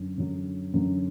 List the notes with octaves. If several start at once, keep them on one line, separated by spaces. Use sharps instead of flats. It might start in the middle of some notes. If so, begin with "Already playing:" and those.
Already playing: F#2 D3 F#3
F#2 D3 F#3
F#2 D3 F#3